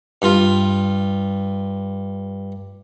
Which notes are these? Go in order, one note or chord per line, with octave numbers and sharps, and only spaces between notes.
G2 F4